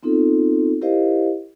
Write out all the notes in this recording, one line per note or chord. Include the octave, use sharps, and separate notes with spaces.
B3 C4 D#4 F4 A4
E4 G4 A#4 C5 D#5 F5